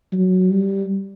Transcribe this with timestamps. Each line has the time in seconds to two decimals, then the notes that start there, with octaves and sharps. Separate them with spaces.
0.13 F#3
0.51 G3